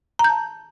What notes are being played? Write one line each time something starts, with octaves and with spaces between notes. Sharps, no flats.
A#5
G6
A5